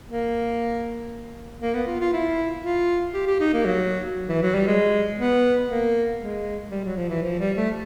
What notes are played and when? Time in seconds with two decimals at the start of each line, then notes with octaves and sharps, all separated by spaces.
0.09 A#3
1.62 A#3
1.74 B3
1.87 F4
2.00 F4
2.13 E4
2.63 F4
3.14 G4
3.27 G4
3.40 D#4
3.53 A#3
3.65 F#3
4.29 E3
4.42 F#3
4.54 G3
4.67 G#3
5.19 B3
5.69 A#3
6.21 G#3
6.71 G3
6.84 F#3
6.97 F3
7.09 E3
7.23 F3
7.39 G3
7.57 A3